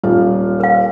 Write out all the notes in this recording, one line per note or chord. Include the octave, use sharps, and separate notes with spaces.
D#1 F4
A#4 F5